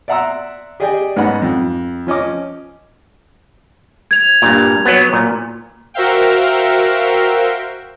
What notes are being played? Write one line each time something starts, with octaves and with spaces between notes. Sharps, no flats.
D5 E5 F#5 A#5 C6 E6
G4 G#4 D5 D#5 G5 G#5
G#2 B3 C#4 D#4 F#5 B5
F2
F3 C#4 D#5 D6
G#6 F7
G2 A#2
F#3 B3
A#2
F#4 A#4 C5 E5 F5 G5